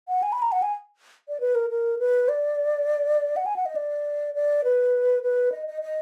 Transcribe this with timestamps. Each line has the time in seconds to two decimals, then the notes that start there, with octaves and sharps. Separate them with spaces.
0.08 F#5
0.23 G#5
0.32 B5
0.42 A#5
0.52 F#5
0.62 G#5
1.29 D5
1.40 B4
1.55 A#4
1.70 A#4
1.99 B4
2.28 D5
3.36 F#5
3.46 G#5
3.56 F#5
3.66 D#5
3.76 D5
4.34 D5
4.64 B4
5.23 B4
5.52 D#5
5.67 D#5
5.82 D#5